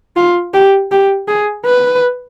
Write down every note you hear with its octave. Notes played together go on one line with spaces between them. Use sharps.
F4
G4
G4
G#4
B4